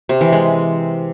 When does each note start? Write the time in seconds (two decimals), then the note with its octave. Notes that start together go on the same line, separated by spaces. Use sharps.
0.09 C3
0.21 E3
0.32 G#3